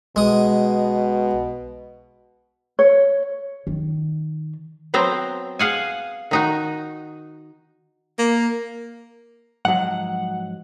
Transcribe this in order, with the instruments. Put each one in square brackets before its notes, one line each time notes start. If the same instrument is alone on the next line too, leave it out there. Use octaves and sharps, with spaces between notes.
[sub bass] B1 [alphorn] B2 [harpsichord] G#3 D#6
[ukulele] C#5
[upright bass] D#3
[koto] F#3 B3 C4 C5 G5 A#5
G#4 F5 F#5 G#5
D#3 D#4 F#4
[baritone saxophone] A#3
[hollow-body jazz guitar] G#2 F3 F#3 [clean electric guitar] F#5